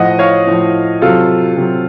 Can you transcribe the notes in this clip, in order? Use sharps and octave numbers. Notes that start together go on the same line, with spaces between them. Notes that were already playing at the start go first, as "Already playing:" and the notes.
Already playing: A2 F3 D#5 F#5
C#5 F5
A2 F3
C3 F#3 F4 A4
C3 F#3